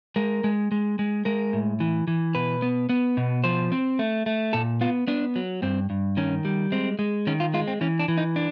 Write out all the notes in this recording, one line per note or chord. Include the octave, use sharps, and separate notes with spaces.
G#3 A#4
G#3
G#3
G#3
G#3 A#4
A2
E3
E3
B2 B4
B3
B3
B2
F3 C5
C4
A3
A3
A#2 A4
B3 F4
B3 D4
F#3
G2 C4
G2
D#3 C#4
G3
G#3 C4
G#3
D#3 C#4
F4
G#3 F4
C4
E3 C#4
D4
E3
D#4
D4